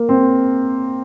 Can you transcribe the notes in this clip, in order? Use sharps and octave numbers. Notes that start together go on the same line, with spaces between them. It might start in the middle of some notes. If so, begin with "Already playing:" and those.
Already playing: A#3
C4